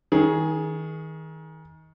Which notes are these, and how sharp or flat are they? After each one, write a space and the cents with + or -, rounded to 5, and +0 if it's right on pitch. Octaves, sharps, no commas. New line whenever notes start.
D#3 +30 G#4 +5